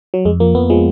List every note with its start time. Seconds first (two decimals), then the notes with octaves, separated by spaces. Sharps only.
0.14 F#3
0.25 F2 G#3
0.40 F3 A#3
0.55 F2 B3
0.70 F3 G#3